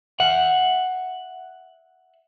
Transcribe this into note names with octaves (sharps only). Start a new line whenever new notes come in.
E5 F#5